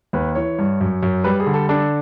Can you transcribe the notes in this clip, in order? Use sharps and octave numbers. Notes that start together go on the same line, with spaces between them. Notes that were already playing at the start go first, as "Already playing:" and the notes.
D#2 B4
E3 C#5
G2
F#2
F#2
G3 B4
G#4
D3
A4
D4 A4